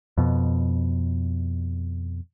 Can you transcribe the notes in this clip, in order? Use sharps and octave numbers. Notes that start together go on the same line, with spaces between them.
F2 B2